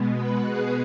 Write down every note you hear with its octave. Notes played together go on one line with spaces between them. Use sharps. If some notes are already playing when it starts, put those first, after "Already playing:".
Already playing: B2 G#3 B3
B4
G#4